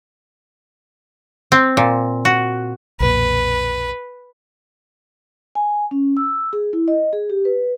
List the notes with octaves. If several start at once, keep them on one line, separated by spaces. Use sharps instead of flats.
C4
A#2
F#4
B1 F2 A#2 B4
G#5
C#4
E6
G#4
E4
D#5
G#4
G4
B4